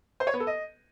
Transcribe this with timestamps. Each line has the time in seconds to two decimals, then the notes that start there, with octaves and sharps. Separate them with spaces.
0.20 C5
0.27 C#5
0.34 B3
0.40 A4
0.47 D#5